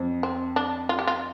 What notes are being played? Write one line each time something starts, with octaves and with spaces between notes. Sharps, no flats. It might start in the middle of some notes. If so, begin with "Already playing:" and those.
Already playing: F2
C4
D4
F4
G4
F4